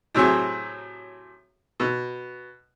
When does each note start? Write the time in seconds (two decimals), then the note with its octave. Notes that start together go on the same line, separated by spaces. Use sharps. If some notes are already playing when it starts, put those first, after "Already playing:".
0.15 A2 C3 F#3 G#4 C#6
1.80 B2